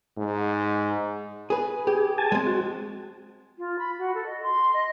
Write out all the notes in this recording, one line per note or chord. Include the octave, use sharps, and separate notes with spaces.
G#2
G#4 B4
G4 G#4
G#5 A5
G#3 C4
F#4
F4
B5
F#4
A4
D#5
C6
D#5